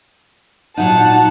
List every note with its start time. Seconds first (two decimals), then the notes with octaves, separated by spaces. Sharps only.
0.77 A#2 F#3 D#4 F#5 A5